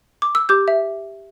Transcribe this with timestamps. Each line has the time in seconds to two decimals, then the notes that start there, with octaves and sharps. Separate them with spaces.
0.22 D6
0.35 E6
0.49 G4 D6 G6
0.68 E5